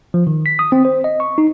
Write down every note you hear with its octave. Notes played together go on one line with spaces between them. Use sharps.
F3
D#3
B6
D#6
C4
C5
D#5
C#6
D#4